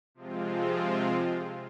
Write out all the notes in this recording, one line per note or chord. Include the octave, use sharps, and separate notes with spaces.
C3 F3 G#3 C4 F4